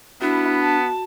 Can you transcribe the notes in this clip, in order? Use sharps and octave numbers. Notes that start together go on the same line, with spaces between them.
B3 D4 E4 F#4
A5